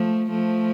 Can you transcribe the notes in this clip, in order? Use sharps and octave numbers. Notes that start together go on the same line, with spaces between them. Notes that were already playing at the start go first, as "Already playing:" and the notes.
Already playing: F3 A3
F3 A3